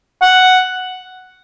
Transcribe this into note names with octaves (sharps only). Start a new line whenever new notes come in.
F#5